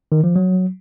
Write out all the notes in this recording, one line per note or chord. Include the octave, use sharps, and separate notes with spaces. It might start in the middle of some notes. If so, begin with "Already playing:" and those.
D#3
F3
F#3